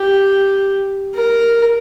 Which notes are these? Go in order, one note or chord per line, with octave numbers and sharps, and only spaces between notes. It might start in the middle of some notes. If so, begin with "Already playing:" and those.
Already playing: G4
A#4